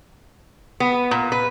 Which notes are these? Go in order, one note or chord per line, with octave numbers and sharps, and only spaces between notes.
B3
A#2
B4